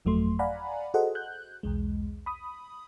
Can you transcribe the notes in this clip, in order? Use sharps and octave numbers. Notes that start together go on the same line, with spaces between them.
G1 F2 F#3 A3 C6
D5 F5 F#5 G#5 A#5 B5
F#4 G#4 A4 C5 D#5 F#5
F#6 G6
B1 E2 G#3
B5 D#6